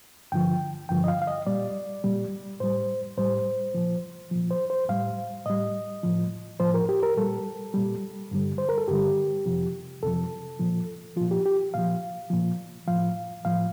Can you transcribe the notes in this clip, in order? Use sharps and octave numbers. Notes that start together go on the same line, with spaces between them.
G2 D3 F3 G5
G2 D3 F3 G5
D#5
F5
F5
D#5
A#2 G3 D5
A#2 G3
A2 G3 C5
A2 G3 C5
A#2 F3
A#2 F3
C5
C5
A2 G3 F5
A2 G3 D#5
A2 F3
A2 F3 C5
A#4
G4
A#4
A#2 G3 A4
A#2 G3
G2 D3 G3
C5
A#4
A4
G2 D3 G3 G4
F2 C3 F3
F2 C3 F3 A4
A#2 F3
A#2 F3 F4
G4
G4
A#2 F3 F5
A#2 F3
A2 F3 F5
A2 F3 F5